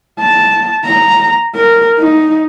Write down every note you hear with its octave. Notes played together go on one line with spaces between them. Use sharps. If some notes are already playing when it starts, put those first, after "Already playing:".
A5
A#5
A#4
D#4